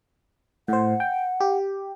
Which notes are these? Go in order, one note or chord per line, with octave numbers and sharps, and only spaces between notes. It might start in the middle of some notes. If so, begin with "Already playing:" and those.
A2 C5 F#5
G5
G4